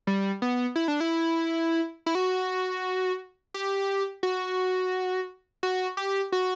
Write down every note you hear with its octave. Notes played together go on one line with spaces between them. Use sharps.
G3
B3
E4
D4
E4
E4
F#4
G4
F#4
F#4
G4
F#4